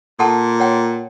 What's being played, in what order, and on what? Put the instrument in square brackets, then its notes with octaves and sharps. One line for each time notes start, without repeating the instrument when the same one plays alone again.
[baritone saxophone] A#2 [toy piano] A4 F#5 A5
[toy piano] C#5 F#5 G5